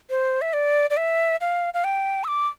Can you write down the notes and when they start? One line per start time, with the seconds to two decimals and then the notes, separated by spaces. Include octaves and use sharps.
0.10 C5
0.42 E5
0.53 D5
0.90 D5
0.97 E5
1.41 F5
1.74 F5
1.84 G5
2.24 E6
2.28 D6